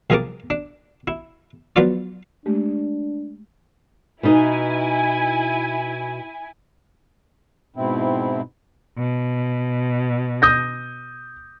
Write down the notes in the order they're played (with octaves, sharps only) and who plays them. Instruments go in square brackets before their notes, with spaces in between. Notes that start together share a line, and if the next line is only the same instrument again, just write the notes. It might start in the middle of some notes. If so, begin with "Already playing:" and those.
[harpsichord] C2 F3 G#4 A#4 A5 D6
D4
E4
F3 F#3 B3 F4 D5
[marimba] G#3 A3 G4 [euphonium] D4
[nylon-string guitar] B2 D#4 [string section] E4 G#5
[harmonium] G#2 B2 C4 E4
[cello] B2
[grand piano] D#6 G6 A#6